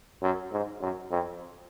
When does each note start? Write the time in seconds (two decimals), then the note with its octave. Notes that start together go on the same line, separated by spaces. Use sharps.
0.22 F#2
0.52 G#2
0.81 F#2
1.11 F2